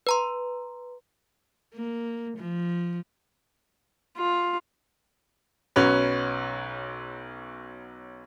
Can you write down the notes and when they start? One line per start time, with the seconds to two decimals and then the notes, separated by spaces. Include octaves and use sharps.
0.07 B4 A#5 C6
1.75 A#3
2.37 F3
4.17 F4
5.76 B1 F#3 C#4 B4